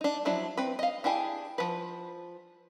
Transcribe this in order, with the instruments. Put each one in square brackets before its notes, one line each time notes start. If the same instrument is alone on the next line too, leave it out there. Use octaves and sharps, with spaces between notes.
[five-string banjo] D4 D#4
F3 F#3 D4 E4
C4 B4
D#5 F5
D4 E4 G4 G#4
F3 B4